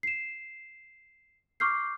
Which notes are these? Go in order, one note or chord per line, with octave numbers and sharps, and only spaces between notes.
C7 E7
C#6 D6 F6 G6 C7